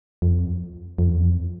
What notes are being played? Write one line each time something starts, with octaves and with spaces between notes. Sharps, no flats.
F2
F2
E2
F2